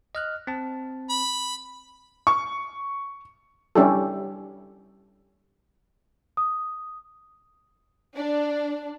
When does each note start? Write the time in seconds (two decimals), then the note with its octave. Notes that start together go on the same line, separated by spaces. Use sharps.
0.15 D#5 F6 F#6
0.47 C4 A5
1.09 B5
2.27 C#6
3.75 G3 C#4 D4 E4 G4 A4
6.37 D#6
8.16 D4